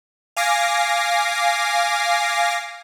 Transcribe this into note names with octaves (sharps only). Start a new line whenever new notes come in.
F5 G#5 D6 A#6 C7